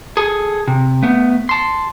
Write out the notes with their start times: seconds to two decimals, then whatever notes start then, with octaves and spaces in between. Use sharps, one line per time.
0.17 G#4 A4
0.68 C3
1.03 A3 B3
1.49 A5 C6